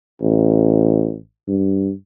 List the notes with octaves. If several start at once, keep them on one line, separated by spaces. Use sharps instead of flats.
A1
G2